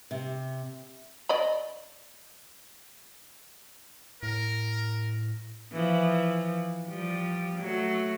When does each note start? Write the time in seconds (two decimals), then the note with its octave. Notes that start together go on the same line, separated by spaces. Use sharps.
0.11 C3
1.29 D5 D#5 B5
4.23 A2 A#4
5.73 E3 F3
6.88 F3 G3
7.60 F#3 A3